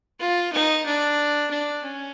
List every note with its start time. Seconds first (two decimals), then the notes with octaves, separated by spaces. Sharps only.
0.20 F4
0.53 D#4
0.85 D4
1.50 D4
1.83 C#4